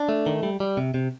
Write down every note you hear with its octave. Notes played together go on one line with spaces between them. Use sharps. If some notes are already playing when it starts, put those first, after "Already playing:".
Already playing: D4
A3
D#3
G3
G3
C3
C3